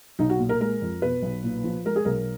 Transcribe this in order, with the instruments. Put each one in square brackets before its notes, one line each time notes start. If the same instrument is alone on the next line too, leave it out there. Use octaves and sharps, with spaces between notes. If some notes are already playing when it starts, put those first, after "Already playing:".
[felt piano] B1 D#4
F#4
A#2
A#4
G#3 A#4
F2
B2 B4
B1
A#2
F3
G#3 A#4
G#4
B1 A#4